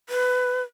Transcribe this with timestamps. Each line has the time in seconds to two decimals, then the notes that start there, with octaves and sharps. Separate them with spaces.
0.09 B4